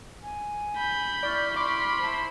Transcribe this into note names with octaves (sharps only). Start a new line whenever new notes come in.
G#5
B5 G6
E4 D5 C#6 F6
B5 C6 D6
E4 C5 A5